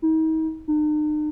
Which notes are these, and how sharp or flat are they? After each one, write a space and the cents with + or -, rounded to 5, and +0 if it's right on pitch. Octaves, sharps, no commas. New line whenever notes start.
D#4 +40
D#4 -45